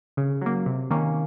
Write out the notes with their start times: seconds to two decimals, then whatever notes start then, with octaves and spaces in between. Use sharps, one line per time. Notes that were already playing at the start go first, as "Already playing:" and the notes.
0.17 C#3
0.42 F#3 A#3
0.66 C3
0.90 D#3 A#3 C#4